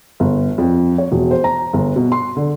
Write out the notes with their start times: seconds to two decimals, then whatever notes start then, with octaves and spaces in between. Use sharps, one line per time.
0.20 G1
0.58 F2
0.98 C#5
1.11 E1
1.31 C5
1.44 A#5
1.73 G1
1.96 B2
2.12 C6
2.36 D3